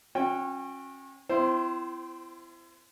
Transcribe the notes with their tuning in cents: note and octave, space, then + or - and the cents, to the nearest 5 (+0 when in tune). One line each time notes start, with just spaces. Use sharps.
C#4 -30 F#4 -40 G5 +0
C4 -30 E4 +35 C5 +0